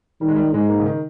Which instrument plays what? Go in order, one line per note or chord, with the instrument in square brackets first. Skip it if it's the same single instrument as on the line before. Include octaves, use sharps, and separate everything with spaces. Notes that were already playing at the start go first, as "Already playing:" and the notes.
[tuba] D#3 [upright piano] G3
[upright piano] G#3
G3
[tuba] G#2 [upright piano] G#3
[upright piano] A#3
C#3
D#3